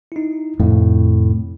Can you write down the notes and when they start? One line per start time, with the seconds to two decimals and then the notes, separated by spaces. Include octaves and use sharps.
0.12 D#4 E4
0.60 F2 A2 C3